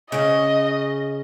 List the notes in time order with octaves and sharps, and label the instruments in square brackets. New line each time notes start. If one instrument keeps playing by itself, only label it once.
[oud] C#3 C#4 [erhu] D#5